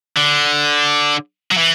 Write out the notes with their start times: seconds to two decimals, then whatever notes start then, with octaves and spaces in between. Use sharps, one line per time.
0.16 D3
1.52 F#3
1.57 E3